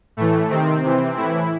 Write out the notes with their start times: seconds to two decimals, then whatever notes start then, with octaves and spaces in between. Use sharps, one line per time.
0.17 A2 E3 A3
0.49 C3 D#3 C4
0.83 C3 E3
1.16 A2 E3 E4